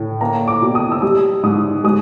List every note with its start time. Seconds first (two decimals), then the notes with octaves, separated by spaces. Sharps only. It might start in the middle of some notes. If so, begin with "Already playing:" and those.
Already playing: A2
0.21 A#3 A#5
0.48 D6
0.62 B2
0.75 D#6
0.92 E6
1.02 G3 D#6
1.43 G#2 D#6
1.84 G#3 D#6